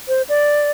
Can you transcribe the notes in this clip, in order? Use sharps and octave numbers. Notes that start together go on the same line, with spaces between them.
C5
D5